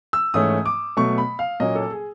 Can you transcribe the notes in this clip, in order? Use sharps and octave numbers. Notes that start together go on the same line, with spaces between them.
E6
G#2 E3 A3 C#4 D#6
D6
B2 F#3 A3 C#6
B5
F5
A#2 F#3 A#3 C#4 D#5
A4
G#4